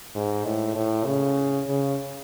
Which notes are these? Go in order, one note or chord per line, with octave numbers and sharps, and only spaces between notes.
G#2
A2
A2
C#3
C#3